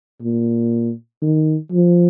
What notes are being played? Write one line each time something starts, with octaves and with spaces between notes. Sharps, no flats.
A#2
D#3
F3